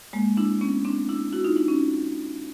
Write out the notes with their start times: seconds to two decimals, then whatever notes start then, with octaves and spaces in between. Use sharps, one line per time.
0.13 G#3 A#3
0.37 D4 E4
0.61 B3 C#4
0.85 C4 D4
1.09 D4 E4
1.33 E4 F#4
1.44 D#4 F4
1.56 D4 E4
1.68 C#4 D#4